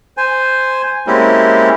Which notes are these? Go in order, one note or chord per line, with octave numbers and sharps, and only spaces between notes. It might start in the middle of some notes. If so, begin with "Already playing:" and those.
C5 G#5
G#3 A#3 C4 C#4 E4 G4